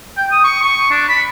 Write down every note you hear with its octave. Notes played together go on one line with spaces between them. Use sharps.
G5
D#6
C#6
C#6
D4
B5